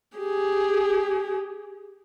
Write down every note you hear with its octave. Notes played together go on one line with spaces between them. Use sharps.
G4 G#4